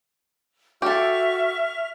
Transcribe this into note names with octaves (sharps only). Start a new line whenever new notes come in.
F#4 G4 A4 E5 C#6 F6